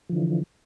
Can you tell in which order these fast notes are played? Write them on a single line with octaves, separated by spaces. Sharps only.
F3 D3 E3